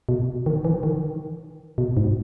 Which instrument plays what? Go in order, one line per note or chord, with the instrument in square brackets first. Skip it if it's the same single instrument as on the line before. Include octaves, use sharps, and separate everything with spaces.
[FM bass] B2
D#3
E3
D#3
B2
G#2